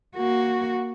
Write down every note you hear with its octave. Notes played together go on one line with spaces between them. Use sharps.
A#3 F#4